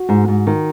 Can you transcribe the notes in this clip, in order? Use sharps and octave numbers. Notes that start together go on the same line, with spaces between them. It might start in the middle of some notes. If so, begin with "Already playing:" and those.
Already playing: F#4
G#2
G#2
D#3